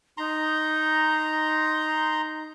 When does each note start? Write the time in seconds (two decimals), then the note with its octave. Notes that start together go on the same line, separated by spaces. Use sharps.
0.18 D#4 A#5 C6